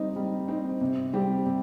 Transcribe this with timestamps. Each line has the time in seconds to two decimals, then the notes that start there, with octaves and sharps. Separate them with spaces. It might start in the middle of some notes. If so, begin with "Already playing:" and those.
Already playing: G3 C4 D#4
0.16 G3
0.48 C4 D#4
0.81 C3
1.13 G3 C4 G4
1.46 C3